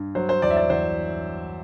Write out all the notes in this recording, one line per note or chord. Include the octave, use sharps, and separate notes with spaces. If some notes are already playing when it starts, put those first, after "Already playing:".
Already playing: G2
F#3 C5
C5
E2 D5
E5
D5
E2 C5